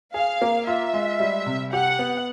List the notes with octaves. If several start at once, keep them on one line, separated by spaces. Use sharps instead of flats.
G#4 F5
A#3
F4 E5
G#3
G3
C3
G4 F#5
B3